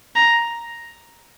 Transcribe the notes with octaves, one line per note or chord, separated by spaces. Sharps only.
A#5